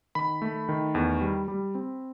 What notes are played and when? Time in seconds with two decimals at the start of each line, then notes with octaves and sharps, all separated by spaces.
0.15 D#3 B5
0.42 A3
0.69 D#3
0.95 E2
1.21 G3
1.48 G3
1.75 C4